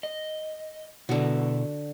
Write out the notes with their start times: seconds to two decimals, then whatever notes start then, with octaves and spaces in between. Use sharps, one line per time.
0.03 D#5
1.09 B2 D3 B3 E4 F#4